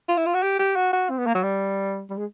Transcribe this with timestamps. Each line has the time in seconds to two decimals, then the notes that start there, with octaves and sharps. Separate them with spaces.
0.09 F4
0.17 E4
0.26 F4
0.34 F#4
0.43 G4
0.59 G4
0.76 F#4
0.93 F#4
1.10 C4
1.18 B3
1.27 A#3
1.35 F#3
1.43 G3
2.10 G3
2.18 G#3